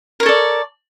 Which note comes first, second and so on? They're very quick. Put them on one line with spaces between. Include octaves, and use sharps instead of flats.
A#4 C#5 A4 D5